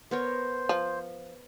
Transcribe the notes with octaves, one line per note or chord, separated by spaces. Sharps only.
B3 A#4 C5 C#5
F3